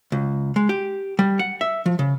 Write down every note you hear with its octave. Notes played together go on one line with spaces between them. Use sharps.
C#2
G#3
G4
G3
F#5
E5
F3
C#3